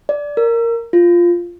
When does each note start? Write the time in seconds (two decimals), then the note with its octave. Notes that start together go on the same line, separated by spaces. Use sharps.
0.09 D5
0.37 A#4
0.93 F4